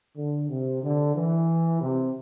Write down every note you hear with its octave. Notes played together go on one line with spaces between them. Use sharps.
D3
C3
D3
E3
C3